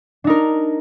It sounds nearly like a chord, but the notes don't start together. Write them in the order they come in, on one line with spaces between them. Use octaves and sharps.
D4 D#4 A#4